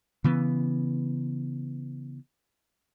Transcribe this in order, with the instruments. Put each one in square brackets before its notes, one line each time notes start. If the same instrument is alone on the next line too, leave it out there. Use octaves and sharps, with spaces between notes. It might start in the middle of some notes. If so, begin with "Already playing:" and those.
[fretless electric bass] C#3 E3 B3